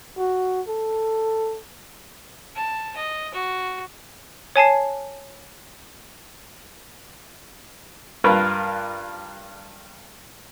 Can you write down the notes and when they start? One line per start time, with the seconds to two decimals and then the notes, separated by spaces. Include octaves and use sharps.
0.18 F#4
0.68 A4
2.55 A5
2.96 D#5
3.34 F#4
4.56 C#5 G#5 A5 C7
8.24 G2 F4 A#4 B4 F#6